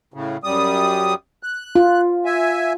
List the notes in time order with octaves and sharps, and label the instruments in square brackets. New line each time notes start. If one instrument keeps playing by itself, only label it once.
[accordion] A2 C#3
F#2 G3 D#6
F#6
[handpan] F4
[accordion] E5 G#5